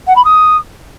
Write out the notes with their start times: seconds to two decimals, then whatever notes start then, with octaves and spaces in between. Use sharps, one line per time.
0.07 F#5
0.16 B5
0.24 D#6